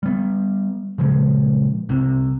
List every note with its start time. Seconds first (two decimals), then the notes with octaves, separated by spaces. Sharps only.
0.03 G3 B3
0.98 A#2 C#3 F3 G#3
1.89 C2 C3